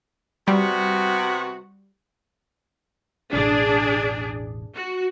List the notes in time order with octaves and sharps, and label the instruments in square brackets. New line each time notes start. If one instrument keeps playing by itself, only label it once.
[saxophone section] C3 B3 F#4 [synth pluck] G3
[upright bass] E1 A1 [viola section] D4 G#4
[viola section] F#4